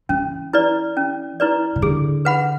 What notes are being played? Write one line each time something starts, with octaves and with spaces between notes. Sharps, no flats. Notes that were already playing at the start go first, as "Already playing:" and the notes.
E3 C#4
E4 B4 D5
C#4
E4 B4 D5
C#3
D3 G#4
B4 F#5 B5